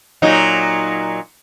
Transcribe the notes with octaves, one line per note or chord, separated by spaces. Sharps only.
A#2 F#3 D#4